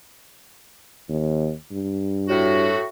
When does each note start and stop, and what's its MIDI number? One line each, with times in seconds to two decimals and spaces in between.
1.09 1.53 39
1.72 2.75 43
2.29 2.86 45
2.29 2.86 66